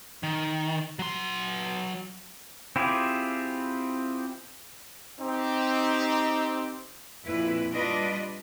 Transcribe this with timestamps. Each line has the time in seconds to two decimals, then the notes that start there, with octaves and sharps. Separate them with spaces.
0.23 D#3
0.99 F#3 C6
2.76 C4 E4 F4 G4 G#4
5.21 C4 D#4 G4
7.25 F2 A#2 E4 B4
7.72 G3 D4 F4 B4 D#5